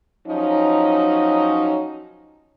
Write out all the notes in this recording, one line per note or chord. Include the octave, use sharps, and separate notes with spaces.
F3 F#3 C#4 D#4